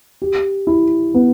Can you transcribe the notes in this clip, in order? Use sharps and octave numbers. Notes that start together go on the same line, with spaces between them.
G4
E4
B3